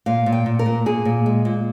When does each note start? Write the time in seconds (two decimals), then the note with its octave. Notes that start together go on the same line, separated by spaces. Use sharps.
0.06 A#2 F5
0.26 A#2
0.32 G5
0.46 A#2
0.59 A#4
0.66 A#2
0.86 A#2 G#4
1.05 A#2
1.26 G#3
1.45 A#2